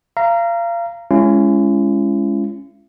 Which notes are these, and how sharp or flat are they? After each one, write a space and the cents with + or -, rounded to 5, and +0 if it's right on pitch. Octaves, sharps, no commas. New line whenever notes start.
F5 -30 A#5 -5
G#3 +0 C#4 +0 E4 +45